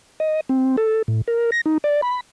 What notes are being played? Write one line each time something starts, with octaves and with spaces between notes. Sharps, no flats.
D#5
C4
A4
A2
A#4
A#6
D#4
D5
B5